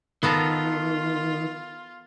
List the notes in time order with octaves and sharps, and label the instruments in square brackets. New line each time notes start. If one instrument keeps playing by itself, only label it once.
[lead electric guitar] D#3 [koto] B3 A4 A#4 [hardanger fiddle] F4